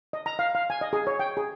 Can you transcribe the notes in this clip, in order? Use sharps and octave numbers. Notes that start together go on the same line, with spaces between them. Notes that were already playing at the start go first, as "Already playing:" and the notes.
D#5
A#5
F5
F5
G#5
D#5
G#4
C#5
G5
G#4